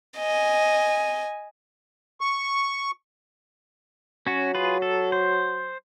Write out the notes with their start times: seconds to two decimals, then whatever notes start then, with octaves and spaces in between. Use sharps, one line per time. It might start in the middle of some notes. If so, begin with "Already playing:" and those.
0.18 D#5 G#5
2.21 C#6
4.27 F#3 C#4 F#4
4.55 F4 G#4 B4
4.82 A4
5.12 C5